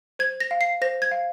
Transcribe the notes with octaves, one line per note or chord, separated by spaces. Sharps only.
C5 G#6
A#6
F5
C7
C5 A#6
G#6
F5